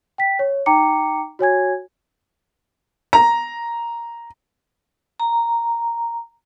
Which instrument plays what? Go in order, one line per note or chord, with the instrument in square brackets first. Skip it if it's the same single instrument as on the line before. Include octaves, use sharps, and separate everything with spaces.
[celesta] G5 B6
C#5
D#4 G5 A#5 D6 C#7
F#4 C#5 G#5 G#6
[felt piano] A#5
[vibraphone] A#5